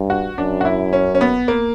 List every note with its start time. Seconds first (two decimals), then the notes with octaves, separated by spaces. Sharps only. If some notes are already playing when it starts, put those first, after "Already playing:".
Already playing: G2
0.10 F#4
0.38 F#2 D4
0.61 F#4
0.65 E4
0.93 C#4
1.15 C#4
1.21 B3
1.48 A#3